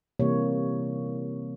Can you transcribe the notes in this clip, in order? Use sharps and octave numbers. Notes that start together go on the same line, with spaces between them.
C3 E3 G3 A#3 C#5